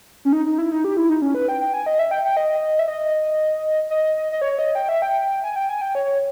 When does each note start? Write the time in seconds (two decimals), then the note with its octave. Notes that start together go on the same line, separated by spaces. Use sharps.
0.25 C#4
0.33 D#4
0.46 D#4
0.58 E4
0.72 D#4
0.84 G4
0.97 E4
1.09 D#4
1.22 C#4
1.35 B4
1.49 G5
1.60 G5
1.74 G#5
1.86 D#5
1.99 E5
2.11 G5
2.25 G5
2.37 D#5
2.79 E5
2.88 D#5
3.90 D#5
4.32 D#5
4.42 C#5
4.59 D#5
4.75 G5
4.89 E5
5.02 G5
5.44 G#5
5.56 G5
5.69 G#5
5.81 G5
5.95 C#5